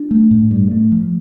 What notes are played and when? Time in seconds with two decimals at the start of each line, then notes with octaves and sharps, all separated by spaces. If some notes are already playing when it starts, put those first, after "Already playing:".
Already playing: D4
0.11 A3
0.31 A2
0.51 G2
0.71 A3
0.92 F3